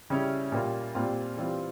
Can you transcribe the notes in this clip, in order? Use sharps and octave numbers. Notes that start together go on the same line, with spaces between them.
C#3 G3 C#4 E4
A#2 G3 A#3 F4
A#2 G3 C4 F4
E3 G3 C4 F4